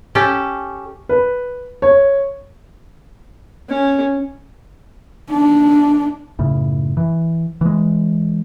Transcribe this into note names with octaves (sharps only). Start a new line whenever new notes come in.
C#4 G4 A4
B4
C#5
C#4
D4
F#2 A2 C#3
E3
E3 G#3